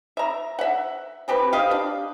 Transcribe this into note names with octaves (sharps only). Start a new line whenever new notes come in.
E5 A#5
E5 F#5
E3 C4 G4 B4
G4 D#5 F5
D4